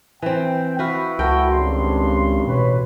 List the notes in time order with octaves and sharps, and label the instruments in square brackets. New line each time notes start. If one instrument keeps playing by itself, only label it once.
[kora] E3 C4 [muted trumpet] G5
[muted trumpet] E4 [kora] F#4 B4 F5
[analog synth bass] C#2 [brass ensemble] F#4 [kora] A4 A#4 G5
[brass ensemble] G#1 G2 C#3 [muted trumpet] C6
[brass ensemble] A1 B4 C#5 [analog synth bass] B2